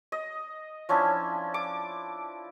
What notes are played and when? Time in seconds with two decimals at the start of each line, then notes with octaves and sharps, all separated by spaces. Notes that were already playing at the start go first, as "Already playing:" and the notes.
0.12 D#5
0.89 F3 C#4 D4 E4
1.54 D6